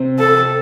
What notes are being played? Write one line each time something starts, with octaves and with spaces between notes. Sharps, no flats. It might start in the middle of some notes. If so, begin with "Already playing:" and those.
Already playing: C3 C4
A4